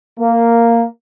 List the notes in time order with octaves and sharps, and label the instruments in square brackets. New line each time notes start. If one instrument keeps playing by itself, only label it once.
[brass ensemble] A#3